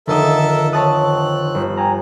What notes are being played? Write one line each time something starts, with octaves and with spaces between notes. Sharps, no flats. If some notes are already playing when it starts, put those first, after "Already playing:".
F1 D3 D#3 A4 A#4 D#5 E5
C4 C#5 A5 D#6 F#6
G1
G5 G#5 A#5